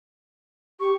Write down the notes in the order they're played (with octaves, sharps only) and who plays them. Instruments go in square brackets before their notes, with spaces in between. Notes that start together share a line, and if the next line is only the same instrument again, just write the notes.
[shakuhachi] G4 [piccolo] C#6